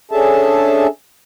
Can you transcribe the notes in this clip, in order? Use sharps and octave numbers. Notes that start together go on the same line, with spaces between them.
C#4 D4 G#4 A4 E5 A5